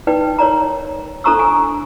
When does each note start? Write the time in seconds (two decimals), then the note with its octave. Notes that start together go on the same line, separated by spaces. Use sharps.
0.07 D#4 B4 D5 G5
0.39 A#4 C#5 D5 A#5
1.24 D4 A4 C5 A#5 C#6 E6
1.39 G#5 A#5 C#6